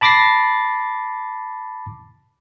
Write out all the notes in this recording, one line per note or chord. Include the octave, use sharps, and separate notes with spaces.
A5 B5 D6 A6 A#6 C7